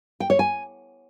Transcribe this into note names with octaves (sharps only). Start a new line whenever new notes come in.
G5
C#5
G#5